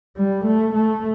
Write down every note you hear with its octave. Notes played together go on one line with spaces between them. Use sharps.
G3
A3
A3